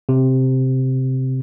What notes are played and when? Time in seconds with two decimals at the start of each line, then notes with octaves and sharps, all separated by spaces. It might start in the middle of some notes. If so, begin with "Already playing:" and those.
0.09 C3